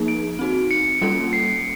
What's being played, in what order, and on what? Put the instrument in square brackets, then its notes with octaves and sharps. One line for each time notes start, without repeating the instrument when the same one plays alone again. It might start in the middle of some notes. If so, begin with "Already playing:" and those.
Already playing: [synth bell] F3 A#3 D#4 G#4
[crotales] D7
[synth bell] C4 D#4 F#4
[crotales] C#7
[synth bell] G3 A#3 C#4 F4 A4
[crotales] C7